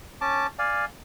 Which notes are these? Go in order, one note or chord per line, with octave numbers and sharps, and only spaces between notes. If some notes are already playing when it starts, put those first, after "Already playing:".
C#4 A5 D6
D5 F5 G#5